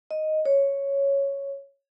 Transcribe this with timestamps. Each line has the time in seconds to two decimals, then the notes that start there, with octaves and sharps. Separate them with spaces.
0.11 D#5
0.45 C#5